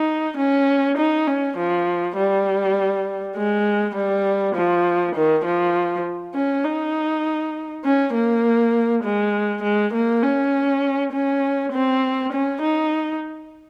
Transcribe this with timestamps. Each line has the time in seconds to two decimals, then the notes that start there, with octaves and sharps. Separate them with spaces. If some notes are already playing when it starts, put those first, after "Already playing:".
Already playing: D#4
0.37 C#4
0.98 D#4
1.27 C#4
1.57 F3
2.17 G3
3.36 G#3
3.95 G3
4.55 F3
5.15 D#3
5.45 F3
6.34 C#4
6.64 D#4
7.84 C#4
8.14 A#3
9.04 G#3
9.63 G#3
9.94 A#3
10.23 C#4
11.12 C#4
11.73 C4
12.33 C#4
12.61 D#4